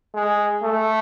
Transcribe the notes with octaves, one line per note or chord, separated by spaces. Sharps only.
G#3
A3